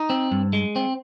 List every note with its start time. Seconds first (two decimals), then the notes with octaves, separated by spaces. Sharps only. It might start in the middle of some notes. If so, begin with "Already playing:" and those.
Already playing: D#4
0.10 C4
0.31 G2
0.53 G#3
0.76 C4